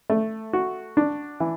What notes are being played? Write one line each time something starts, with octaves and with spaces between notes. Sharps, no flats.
A3
F#4
D4
E3